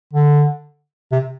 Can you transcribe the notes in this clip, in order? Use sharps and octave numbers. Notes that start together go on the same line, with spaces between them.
D3
C3